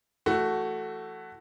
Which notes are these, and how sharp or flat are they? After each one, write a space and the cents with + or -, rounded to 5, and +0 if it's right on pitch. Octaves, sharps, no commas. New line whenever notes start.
E3 +15 A3 +0 F#4 +10